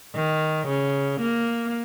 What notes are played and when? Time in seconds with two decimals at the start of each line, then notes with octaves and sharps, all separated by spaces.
0.15 D#3
0.68 C#3
1.21 A#3